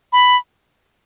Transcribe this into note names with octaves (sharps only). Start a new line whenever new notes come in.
B5